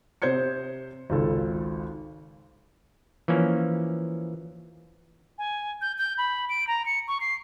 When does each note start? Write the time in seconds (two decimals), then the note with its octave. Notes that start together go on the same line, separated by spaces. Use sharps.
0.22 C3 C5 G6 G#6 C#7
1.10 G#1 C#2 A4
3.28 E3 F3 A#3 C#4
5.38 G#5
5.81 G6
5.98 G6
6.18 B5
6.49 D7
6.68 A#5
6.86 C#7
7.08 C#6
7.21 C7